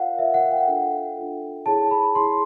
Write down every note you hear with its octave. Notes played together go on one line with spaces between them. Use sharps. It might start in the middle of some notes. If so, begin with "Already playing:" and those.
Already playing: F4 A#4 C#5 F5 F#5
F4 A#4 C#5 E5
F#5
G5
D4 F4 A4
D4 F4 A4
E4 G#4 C#5 A5
B5
E4 G#4 C#5 C6